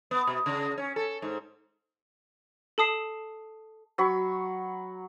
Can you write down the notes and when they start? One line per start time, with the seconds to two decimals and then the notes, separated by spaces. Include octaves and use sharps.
0.11 B3
0.27 B2
0.46 C#3
0.78 C#4
0.96 A4
1.22 G#2
2.78 A4 A5 D#6 C7 E7
3.98 F#3 B5 C#6